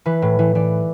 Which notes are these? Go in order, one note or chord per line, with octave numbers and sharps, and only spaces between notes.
E3 B4
A2
E3
E3 D5